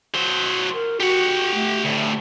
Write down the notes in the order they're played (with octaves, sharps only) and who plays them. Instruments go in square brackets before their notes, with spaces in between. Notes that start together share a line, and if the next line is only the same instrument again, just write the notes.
[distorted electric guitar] F#3 C5
[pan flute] A#4
[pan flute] F#4 [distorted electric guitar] G4 F#5
[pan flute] A3
[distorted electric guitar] D2 A2